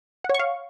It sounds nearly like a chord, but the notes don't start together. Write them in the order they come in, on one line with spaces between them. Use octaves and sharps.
F#5 C#5 C#6 F5